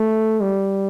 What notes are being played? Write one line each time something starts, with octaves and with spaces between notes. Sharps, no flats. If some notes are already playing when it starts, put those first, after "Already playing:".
Already playing: A3
G3